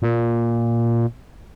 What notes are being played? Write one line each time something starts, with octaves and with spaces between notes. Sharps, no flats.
A#2